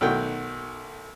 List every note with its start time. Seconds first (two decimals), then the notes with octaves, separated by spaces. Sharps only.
0.01 B1 D#3 A3 F#4 G5